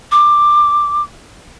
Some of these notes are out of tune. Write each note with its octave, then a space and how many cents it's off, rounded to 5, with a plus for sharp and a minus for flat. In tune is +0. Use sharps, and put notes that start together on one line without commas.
D6 +10